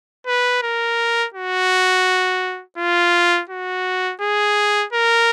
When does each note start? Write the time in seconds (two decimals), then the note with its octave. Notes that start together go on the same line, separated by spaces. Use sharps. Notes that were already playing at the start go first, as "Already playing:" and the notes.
0.27 B4
0.62 A#4
1.34 F#4
2.78 F4
3.49 F#4
4.21 G#4
4.93 A#4